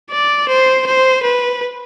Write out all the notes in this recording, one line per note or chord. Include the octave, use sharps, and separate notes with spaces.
D5
C5
C5
B4